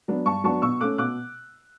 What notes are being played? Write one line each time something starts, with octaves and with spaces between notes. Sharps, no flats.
F#3 B3 D4
G2 A5 C#6
F#3 B3 D4 A5 C#6
B2 C#6 E6
A3 C#4 D6 F#6
B2 D6 F#6